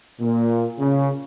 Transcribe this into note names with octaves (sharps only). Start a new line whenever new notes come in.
A#2
C#3